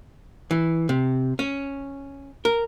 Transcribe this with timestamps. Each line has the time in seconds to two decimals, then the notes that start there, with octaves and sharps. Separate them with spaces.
0.51 E3
0.89 C3
1.39 C#4
2.45 A#4